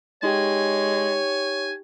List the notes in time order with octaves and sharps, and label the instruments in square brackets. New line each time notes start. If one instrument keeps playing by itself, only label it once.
[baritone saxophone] G#3 [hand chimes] D#4 G4 G5 [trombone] C#5 [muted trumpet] G#5